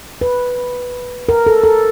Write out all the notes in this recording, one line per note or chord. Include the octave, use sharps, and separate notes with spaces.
B4
A#4
A4
A4